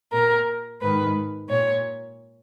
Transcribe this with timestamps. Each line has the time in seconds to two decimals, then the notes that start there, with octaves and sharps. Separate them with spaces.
0.12 A#2 A#4
0.81 G#2 D#3 B4
1.49 A#2 C#5